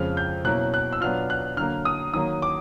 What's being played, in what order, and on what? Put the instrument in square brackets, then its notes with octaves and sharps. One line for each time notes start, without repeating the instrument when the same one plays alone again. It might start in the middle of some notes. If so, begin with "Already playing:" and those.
Already playing: [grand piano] F2 C#3 F3 G#3 F6
G6
B2 F#3 A#3 C#4 E4 F#6
F#6
E6
B2 F#3 B3 D4 F4 F6
F#6
D3 F#3 A#3 F6
D#6
D#3 F#3 A#3 D#6
D6